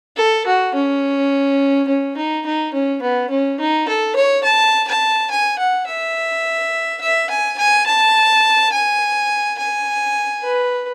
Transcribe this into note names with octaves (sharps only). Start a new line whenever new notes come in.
A4
F#4
C#4
C#4
D#4
D#4
C#4
B3
C#4
D#4
A4
C#5
A5
A5
G#5
F#5
E5
E5
G#5
G#5
A5
G#5
G#5
B4